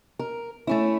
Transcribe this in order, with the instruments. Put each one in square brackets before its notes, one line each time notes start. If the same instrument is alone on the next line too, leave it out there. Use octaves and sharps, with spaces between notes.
[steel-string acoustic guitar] A#4
A3 C#4 E4